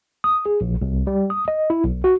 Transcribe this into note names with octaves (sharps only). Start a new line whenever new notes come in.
D#6
G#4
A#1
C2
G3
D#6
D#5
E4
B1
F#4